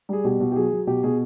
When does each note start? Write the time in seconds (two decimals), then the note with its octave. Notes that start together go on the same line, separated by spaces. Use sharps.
0.09 G3 G#4
0.24 B2 G4
0.40 B2
0.52 G4
0.56 F#3 G#4
0.72 F#3
0.87 B2 G4
1.03 B2 G#4